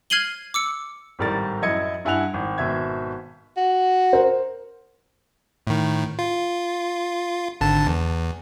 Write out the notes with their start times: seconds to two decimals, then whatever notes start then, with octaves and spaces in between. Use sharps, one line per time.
0.10 F6 G#6 C7 D#7 F#7 G7
0.54 D6 E6 C#7
1.19 G#1 A2 G3 A#4 A6
1.62 F#2 E4 D#5 G#6 C#7
2.05 G2 E4 F#5 G#5 F#6 F7
2.34 G#1
2.58 G#1 B2 E5 G#6
3.57 F#4
4.13 A#4 C5
5.67 A2 D#3
6.19 F4
7.61 G#1 D3 A5
7.87 E2